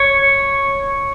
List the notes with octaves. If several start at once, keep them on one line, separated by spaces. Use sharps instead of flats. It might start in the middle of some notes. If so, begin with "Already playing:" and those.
Already playing: C#5